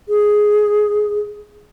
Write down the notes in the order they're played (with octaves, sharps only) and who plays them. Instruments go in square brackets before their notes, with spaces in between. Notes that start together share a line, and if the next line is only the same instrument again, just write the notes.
[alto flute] G#4